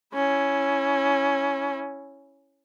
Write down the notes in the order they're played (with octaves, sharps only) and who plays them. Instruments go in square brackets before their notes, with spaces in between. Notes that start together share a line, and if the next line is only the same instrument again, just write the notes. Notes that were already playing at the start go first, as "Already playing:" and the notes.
[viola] C#4 E4